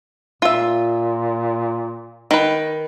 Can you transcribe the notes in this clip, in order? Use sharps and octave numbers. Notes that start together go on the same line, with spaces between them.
A#2 F4 E5
D#3 B4